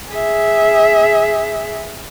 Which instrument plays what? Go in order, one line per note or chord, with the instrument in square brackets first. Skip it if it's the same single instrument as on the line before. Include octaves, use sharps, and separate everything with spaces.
[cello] G#4 E5